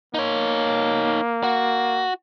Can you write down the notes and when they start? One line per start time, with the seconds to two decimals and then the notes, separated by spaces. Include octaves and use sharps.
0.14 A#3 D#4 C#5
1.43 F#4